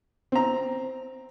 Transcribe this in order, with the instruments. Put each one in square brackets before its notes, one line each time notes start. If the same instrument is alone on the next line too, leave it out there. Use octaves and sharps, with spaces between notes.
[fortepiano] C4 A#5